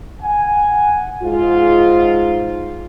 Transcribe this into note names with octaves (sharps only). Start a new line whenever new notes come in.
F#5 G#5
G#2 F4